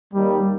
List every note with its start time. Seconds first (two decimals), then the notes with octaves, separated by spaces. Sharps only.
0.13 D#2 D#3 G3